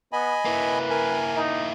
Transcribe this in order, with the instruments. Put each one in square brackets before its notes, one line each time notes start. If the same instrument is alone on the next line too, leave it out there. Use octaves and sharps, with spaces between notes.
[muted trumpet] B3 [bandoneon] D#5 G#5 B5
[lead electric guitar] A#3 E4 [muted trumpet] B4
[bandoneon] A#4 G#5
[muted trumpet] D#4